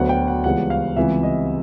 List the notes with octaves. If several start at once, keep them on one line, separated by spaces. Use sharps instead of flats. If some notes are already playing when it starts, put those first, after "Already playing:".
Already playing: D2 D3 F#3 B3 F#5
G5
F#5
C#2 C#3 E3 G3 B3 F#5
F5
C#2 C3 E3 G3 B3 E5
D#5